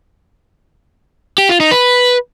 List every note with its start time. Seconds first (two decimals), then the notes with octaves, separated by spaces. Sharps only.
1.38 G4
1.49 F4
1.60 D#4
1.71 B4